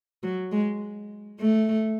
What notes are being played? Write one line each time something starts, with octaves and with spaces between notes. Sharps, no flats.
F#3
G#3
A3